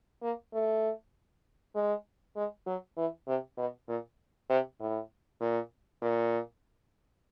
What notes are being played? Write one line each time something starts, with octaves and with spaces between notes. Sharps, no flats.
A#3
A3
G#3
G#3
F#3
E3
C3
B2
A#2
C3
A2
A#2
A#2